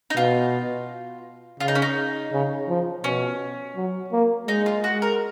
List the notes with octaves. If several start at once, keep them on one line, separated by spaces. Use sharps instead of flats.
D#4
B2 F4
C#3 F4
D#4
C#4
D#4
C#3
F3
B2 C#4
F#3
A#3
G#3 D#4
F4
F#4
A#4